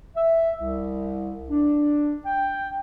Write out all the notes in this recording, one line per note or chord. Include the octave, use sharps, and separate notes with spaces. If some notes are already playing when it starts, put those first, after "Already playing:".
E5
C2
D4
G5